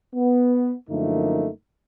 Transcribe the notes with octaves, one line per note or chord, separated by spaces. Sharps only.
B3
F#2 D3 F3 A3 A#3 D#4